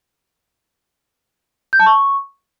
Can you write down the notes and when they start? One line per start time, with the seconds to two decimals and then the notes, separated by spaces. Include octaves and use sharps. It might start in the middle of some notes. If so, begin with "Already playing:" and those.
1.73 G6
1.80 A5
1.86 C#6